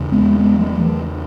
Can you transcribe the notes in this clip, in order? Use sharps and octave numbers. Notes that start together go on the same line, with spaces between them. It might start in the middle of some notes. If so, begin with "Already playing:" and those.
Already playing: E2 C#3
G#3 B3
G#3 B3
F#3 A3
E3